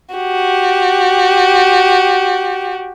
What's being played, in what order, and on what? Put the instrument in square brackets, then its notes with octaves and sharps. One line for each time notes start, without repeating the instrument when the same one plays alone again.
[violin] F#4 G4